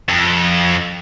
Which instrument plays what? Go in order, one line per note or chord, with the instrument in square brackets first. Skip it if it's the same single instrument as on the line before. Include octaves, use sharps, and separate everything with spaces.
[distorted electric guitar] F2